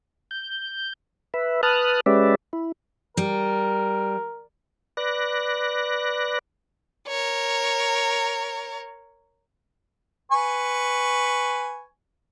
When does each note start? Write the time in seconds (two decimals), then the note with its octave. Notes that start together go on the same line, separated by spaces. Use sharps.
0.31 G6
1.34 B4 E5
1.63 B4 A5 D#6 F6 F#6
2.06 G#3 C#4 G4 B4 D5 E5
2.53 E4
3.17 G3 A#4
4.97 B4 D5 F#6 A#6
7.08 A#4 C#5
10.32 B4 G#5 C#6